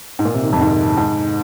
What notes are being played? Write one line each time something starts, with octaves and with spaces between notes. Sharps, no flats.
G#2
A#2
C3
D#3
F2
G#2
G#2